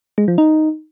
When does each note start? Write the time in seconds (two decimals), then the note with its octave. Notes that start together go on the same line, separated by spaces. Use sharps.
0.18 G#3
0.28 F3
0.38 D#4